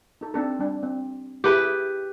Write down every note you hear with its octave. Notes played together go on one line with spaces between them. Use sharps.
D#4 A4
C4 D4 A4
G3 D4
C4
E4 G4 G#4 B4